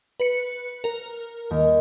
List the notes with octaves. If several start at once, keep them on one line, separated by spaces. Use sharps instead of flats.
B4 C#7
A#4
D#2